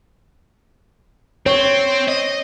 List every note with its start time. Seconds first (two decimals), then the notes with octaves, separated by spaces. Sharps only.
1.46 C4 C#5
2.08 D#5